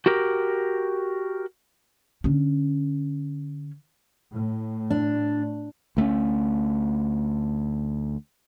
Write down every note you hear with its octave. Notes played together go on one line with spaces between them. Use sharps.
F#4 G4 A#4
D3 C#4
A2
D4
D2 A3 B3 C#4